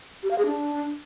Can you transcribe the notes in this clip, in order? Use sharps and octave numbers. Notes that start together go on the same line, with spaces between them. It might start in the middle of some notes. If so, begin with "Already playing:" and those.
G4
F5
G#4
D4